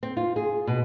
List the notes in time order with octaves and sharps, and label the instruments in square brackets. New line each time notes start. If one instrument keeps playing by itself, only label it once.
[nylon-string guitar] C4
F4
G#4
B2